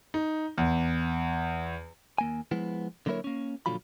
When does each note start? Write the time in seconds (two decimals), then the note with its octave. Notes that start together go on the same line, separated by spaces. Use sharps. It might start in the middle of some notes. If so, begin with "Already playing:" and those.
0.14 D#4
0.58 E2
2.18 D#2 A#3 G#5
2.51 F3 G#3 B3 E4
3.06 D3 F#3 A#3 E4 A#4 C#5
3.24 A#3 C#4
3.66 A#2 D3 F3 F#3 F4 B5